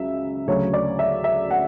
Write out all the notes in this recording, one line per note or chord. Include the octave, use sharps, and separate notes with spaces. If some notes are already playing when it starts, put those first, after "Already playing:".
Already playing: C#2 C#3 F#3 E5
D2 C#3 F#3 C#5
D5
E5
E5
F#5